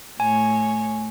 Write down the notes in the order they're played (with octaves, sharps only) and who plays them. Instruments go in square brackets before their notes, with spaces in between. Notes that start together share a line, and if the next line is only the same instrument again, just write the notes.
[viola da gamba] A2 C#5 [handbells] G#5